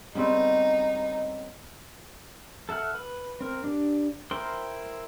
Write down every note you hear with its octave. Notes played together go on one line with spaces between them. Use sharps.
C#3 G3 B3 C4 D#4 F#5
A4 E5 F#5 F6
B4
C4 A#4
D4 G4
E4 A#4 C5 G5 C6